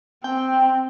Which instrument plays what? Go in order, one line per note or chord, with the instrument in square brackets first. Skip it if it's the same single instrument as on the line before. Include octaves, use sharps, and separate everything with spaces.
[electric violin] C4 [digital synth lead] G5